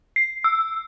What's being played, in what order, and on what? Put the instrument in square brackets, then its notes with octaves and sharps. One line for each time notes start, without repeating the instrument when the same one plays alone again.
[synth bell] C7
E6